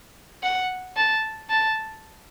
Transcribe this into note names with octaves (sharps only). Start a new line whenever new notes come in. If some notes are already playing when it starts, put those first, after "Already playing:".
F#5
A5
A5